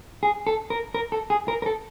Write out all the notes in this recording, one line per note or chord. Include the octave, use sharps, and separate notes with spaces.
G#4
A4
A#4
A#4
A4
G#4
A#4
A#4
A4